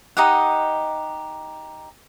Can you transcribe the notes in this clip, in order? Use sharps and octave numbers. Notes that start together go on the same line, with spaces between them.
D#4 G4 D#5 F#5